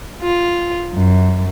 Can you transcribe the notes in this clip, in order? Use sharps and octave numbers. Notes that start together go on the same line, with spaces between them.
F4
F#2